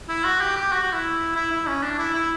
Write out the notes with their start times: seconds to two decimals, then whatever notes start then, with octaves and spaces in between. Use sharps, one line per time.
0.09 E4
0.25 F#4
0.41 G4
0.56 G4
0.72 F#4
0.83 F#4
0.93 E4
1.36 E4
1.51 E4
1.67 C#4
1.83 D4
1.99 E4
2.14 E4